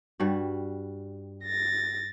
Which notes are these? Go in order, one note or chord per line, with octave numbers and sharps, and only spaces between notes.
G2 G3 F#4
A6 A#6